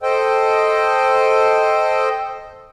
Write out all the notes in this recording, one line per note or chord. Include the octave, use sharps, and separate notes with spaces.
A4 C5 D#5 G5